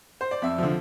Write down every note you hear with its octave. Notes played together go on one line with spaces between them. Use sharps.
C5
D5
F2 E5
D3 F3